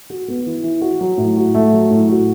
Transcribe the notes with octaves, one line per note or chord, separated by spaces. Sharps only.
F#4
B3
E3
E3
F#4
F#3
A2
F#4
A3
F#3
A2
F#4